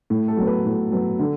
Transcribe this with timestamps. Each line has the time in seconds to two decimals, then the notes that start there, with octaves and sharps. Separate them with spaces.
0.10 A2
0.28 A4
0.37 F#3 B3
0.47 B4
0.65 A2
0.92 F#3 B3
1.19 D3